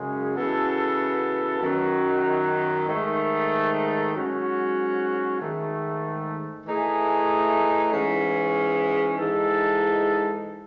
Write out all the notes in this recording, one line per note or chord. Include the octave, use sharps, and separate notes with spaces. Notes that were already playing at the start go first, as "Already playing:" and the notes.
Already playing: F#2 C#3 G#3
C#3 E3 B3 F#4 A4
F#2 D#3 F#3
G#2 D#3 A3
G#2 F#3 C#4 F#4
G#2 D#3 A3
E3 A3 D#4 G#4
G#2 E3 G#3 C#4
G#2 E3 G#3 D#4 A4